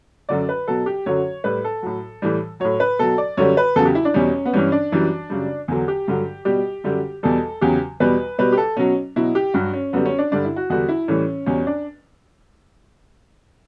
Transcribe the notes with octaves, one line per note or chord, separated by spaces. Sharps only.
F#2 D3 F#3 D5
B4
B2 F#3 A4
G4
F#2 D3 F#3 C#5
A2 G3 B4
A4
A2 F#3
A2 E3 G3
A2 F#3 C#5
B4
B2 F#3 A4
D5
F#2 D3 G3 C#5
B4
E2 C#3 F#3 A4
G4
E4
D4
E2 B2 G3 C#4
B3
G2 E3 G3 C#4
D4
F#2 E3 G3
F#2 C#3 G3
E2 D3 F#3
G4
G2 D3 F#3
B2 G3 G4
F#2 D3 G3
E2 B2 G3 A4
E2 C#3 F#3 G4
E2 B2 G3 B4
B2 G3 B4
G4
A4
B2 F#3 C#4
B2 F#3 E4
G4
G2 F#3 F#4
C#4
F#2 D3 G3 B3
C#4
D4
G2 D3 G3 D4
E4
F#4
E2 D3 G3 F#4
E4
A2 E3 G3 C#4
E2 B2 G3 C#4
D4